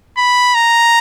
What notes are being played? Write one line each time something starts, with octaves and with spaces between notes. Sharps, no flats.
B5
A#5